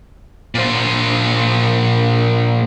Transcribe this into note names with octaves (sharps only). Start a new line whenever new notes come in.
A#2 C5